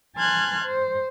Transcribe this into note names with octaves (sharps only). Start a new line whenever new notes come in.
G#5 A5 C6 F6 F#6 G#6
C5